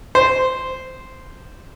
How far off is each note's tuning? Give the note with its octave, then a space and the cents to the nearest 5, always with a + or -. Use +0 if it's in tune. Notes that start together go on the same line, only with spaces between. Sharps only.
C5 -5